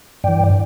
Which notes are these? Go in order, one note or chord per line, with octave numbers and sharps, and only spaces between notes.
G2 E3 D5 G5